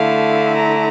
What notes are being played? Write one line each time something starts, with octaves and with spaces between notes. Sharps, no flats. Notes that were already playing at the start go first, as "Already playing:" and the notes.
Already playing: D3 A3 E4 F5
A#5